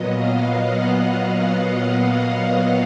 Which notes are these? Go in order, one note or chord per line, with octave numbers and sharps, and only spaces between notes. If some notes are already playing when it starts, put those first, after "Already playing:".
Already playing: A#2 F#3 B3 D#5
F5
F#5
F5
F#5
F5
F#5
F5
D#5